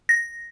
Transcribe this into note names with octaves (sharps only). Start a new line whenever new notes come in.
A#6